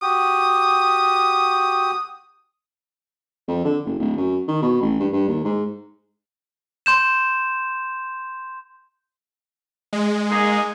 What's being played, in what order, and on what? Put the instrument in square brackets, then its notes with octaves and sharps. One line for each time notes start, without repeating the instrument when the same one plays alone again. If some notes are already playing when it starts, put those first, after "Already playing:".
[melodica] F#4 G4 [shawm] D#6
[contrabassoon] F2
D3
F#1
D1
F#2
D#3
B2
A1
G2
G2
D#2
G#2
[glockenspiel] C6 G6 E7
[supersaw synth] G#3
[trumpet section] A#3 D#4 G#4